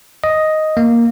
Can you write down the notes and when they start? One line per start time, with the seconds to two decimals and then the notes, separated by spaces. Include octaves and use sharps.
0.24 D#5
0.77 A#3